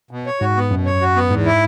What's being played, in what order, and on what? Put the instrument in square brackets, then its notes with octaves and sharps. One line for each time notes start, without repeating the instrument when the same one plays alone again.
[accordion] B2
C#5
[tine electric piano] G#2 [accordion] F#4
[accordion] B3
[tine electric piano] F#2 [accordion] B2
[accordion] C#5
F#4
B3
[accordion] E2 [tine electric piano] G#2
[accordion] E4